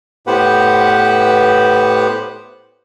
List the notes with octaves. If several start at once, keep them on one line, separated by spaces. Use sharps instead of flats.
A2 B3 G4 B4 C5 F#5